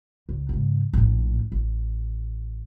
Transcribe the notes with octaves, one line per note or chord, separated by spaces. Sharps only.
C#2
G#2 C#3
A#1 A2
A1